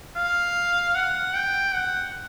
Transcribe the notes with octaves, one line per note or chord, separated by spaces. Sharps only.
F5
F#5
G5
F#5